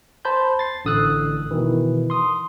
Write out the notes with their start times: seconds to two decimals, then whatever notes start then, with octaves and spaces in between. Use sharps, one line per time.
0.25 C5 A5 B5 G6
0.59 A6 C7
0.85 A1 D3 D#6 E6 F#6
1.51 B2 D#3 E3
2.10 C6 D#6